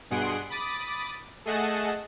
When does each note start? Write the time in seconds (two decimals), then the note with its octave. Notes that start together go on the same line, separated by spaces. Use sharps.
0.10 G2 B2 G#4 F#5 C6 D7
0.50 B5 D6 D#6 A6
1.45 A3 G#4 D#5 F#5 A5